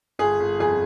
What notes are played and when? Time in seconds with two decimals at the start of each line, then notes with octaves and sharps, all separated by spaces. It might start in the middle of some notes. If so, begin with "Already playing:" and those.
0.19 G1 G#4
0.40 G1
0.60 F2 G#4